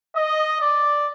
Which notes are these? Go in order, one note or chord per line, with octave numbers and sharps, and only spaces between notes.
D#5
D5